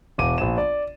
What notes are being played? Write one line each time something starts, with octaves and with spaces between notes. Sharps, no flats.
E1 D6 D#7
A#1 E7
D5